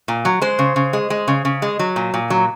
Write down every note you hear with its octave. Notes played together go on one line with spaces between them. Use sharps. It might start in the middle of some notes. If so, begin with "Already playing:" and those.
A#2
F#3
G#3 C5
C#3
C#3
G#3
G#3
C#3
C#3
G#3
F#3
A#2
A#2
F#3